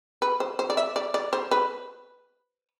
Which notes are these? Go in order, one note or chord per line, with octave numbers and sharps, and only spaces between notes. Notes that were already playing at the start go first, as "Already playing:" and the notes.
B4
C5
C5
D5
E5
D5
D5
C5
B4